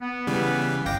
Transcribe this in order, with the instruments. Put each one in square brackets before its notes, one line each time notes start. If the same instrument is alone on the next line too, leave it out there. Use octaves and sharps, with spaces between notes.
[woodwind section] B3
[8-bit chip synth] C#3 E3 G3
[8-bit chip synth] G1 G5 A#6 [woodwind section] D#5 F5 D6